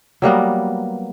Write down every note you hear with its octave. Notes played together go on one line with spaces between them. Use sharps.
F#3 G3 A#3 B3